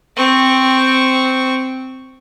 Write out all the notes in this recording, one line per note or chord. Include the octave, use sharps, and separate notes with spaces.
C4 C#6